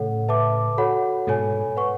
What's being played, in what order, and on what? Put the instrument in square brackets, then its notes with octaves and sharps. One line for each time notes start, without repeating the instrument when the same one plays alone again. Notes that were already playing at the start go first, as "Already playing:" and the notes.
Already playing: [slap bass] A2 C#3 [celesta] A4 C#5 F#5
[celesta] B4 E5 A5 D6
F#4 A4 C#5 F#5 B5
[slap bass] G#2 B2 [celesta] A4 C#5 G#5
[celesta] B4 F#5 C#6